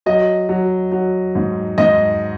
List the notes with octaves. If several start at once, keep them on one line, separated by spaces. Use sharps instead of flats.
F#3 D#5
F#3
F#3
G#2
G#2 D#5